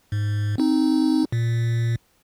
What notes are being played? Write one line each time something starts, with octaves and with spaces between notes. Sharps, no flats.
G#2
C4 D#4
A#2